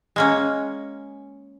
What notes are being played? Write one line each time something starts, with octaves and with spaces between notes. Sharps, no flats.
G#3 A#3 C#4